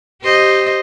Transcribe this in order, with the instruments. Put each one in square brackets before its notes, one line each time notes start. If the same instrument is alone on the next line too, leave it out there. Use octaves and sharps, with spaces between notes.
[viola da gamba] G4 C5 D#5